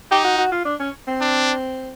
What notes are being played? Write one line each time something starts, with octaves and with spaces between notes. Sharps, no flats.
D#4 G4
F#4
F#4
F4
D4
C#4
C4
D4